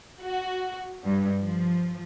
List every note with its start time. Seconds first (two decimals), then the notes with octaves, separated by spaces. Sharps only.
0.22 F#4
1.06 G2
1.41 F3